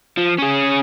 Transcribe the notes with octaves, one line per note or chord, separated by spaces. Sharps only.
F3
C#4 G#4